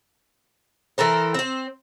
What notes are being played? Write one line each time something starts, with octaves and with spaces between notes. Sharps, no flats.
E3 A4 A#4 C5
C4 C5